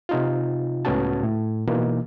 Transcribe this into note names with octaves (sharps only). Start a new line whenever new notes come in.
C3 D#4 F4
C#2 A2 B3 C#4 F#4 A5
A2
B2 E3 A#3 D#4